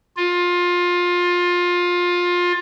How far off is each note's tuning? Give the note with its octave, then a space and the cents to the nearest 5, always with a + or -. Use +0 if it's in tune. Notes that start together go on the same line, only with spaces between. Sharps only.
F4 +20